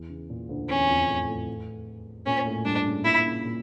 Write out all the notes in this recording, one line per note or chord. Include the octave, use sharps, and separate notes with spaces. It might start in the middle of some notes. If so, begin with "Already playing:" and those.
Already playing: E2 E3
C#3
A#2
D2 D3
E2 E3 C#4
F2 F3
A2 A3
A2 A3
A#2 A#3 C#4
A2 A3
G2 G3 D4
C#3 C#4
A#2 A#3 E4
A#3
C#3 C#4
A#2 A#3